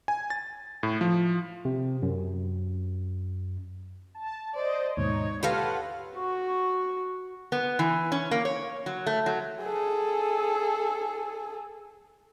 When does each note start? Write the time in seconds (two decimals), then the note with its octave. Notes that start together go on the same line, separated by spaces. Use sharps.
0.08 G#5
0.30 A6
0.83 A2
1.01 F3
1.65 C3
2.02 F#2
4.15 A5
4.55 C5 D5 D#5
4.97 D#2 G#2 B2 D#4 C#5
5.43 F4 G4 A4 B4 F5 F#5 B5 A#6
6.16 F#4 C#6
7.52 B3
7.79 E3
8.12 C#4
8.31 A#3
8.45 C#5
8.86 F#3
9.06 A3
9.26 F#3
9.62 G#4 A4